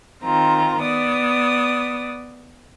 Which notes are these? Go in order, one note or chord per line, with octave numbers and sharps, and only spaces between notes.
D#3 C4 F4 A#5
B3 D5 D#6